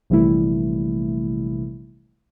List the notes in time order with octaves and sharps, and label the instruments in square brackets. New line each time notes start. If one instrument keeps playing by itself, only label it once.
[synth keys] A#1 C3 E3 G3 A3 E4